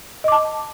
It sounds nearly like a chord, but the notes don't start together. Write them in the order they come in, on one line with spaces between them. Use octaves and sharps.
D#5 D6 A5